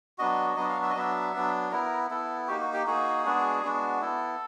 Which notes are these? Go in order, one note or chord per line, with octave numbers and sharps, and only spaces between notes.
F#3 B3 D4 F#4 D#5
F#3 B3 D4 F#4 D#5
F5
E5
D#5
F#3 B3 D4 E5
F#3 B3 D4
B3 E4 A#4
B3 E4 A4
A#3 D#4 F#4 G4
F#4
G4
A#3 D#4 F#4 G#4
G#3 B3 D4 F#4
G#3 B3 D4 F#4
B3 E4 A4